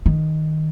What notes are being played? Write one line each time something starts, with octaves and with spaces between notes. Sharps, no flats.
D#3